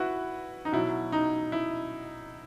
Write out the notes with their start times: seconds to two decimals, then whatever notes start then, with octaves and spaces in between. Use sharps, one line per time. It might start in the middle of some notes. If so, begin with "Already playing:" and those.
Already playing: E4 F#4 B4
0.65 D#4
0.72 B2 F#3 E4
1.12 D#4
1.52 E4